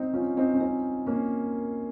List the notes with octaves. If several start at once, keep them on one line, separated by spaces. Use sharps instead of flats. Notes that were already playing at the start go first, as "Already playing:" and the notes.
Already playing: C4 D#4
C#4 F4
C4 D#4
C#4
C4 D#4
A#3 C#4